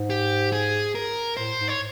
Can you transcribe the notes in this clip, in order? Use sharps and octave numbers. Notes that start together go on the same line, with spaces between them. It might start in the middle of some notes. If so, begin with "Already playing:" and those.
Already playing: G#2
G4
G#4
A#4
A2 C5
G#2
C#5